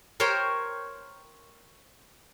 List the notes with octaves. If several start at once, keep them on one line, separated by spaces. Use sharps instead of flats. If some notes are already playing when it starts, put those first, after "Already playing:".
A#4 C5 C#5 G5 A#5 C6